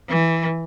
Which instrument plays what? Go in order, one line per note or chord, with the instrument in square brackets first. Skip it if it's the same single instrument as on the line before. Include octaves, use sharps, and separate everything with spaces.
[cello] E3